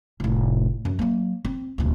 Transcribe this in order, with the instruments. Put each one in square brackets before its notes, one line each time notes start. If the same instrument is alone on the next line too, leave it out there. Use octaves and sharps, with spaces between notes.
[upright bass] F1 A2
F#2 F#3
F#3 A#3
C4
D#1 D2